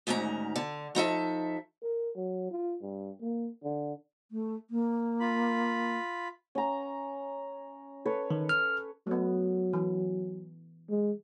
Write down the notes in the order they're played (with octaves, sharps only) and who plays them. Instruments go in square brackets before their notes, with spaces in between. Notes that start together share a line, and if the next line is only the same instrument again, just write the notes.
[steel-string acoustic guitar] D2 G#2 D#3 C#4 A#5
D3
F3 D#4 A4 E5
[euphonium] A#4
F#3
F4
G2
A#3
D3
[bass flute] A3
A#3
[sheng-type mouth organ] F4 B5
[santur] C#4 A#5
A4 B4 C#5
[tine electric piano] D#3
F6
[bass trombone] F#3 [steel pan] A3 B3
[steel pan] E3
[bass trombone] G#3